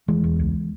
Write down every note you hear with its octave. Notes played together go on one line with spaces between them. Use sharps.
E1 E3 G#3
E2
C#2